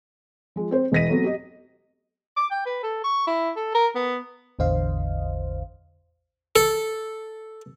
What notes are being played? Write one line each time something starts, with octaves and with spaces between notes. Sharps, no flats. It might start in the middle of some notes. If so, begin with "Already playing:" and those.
F3 G#3
C4 C5
E1 E3 D#5 A#6 B6 D#7
F#3 A3 B3 C4
G4 D#5
D6
G5
B4
A4
C#6
E4
A4
A#4
B3
A1 E2 D3 C5 D#5 F5
A4